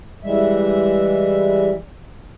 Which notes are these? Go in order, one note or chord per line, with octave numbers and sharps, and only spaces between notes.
E3 G3 G#3 E5